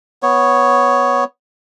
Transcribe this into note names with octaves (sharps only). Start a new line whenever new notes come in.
B3 C#5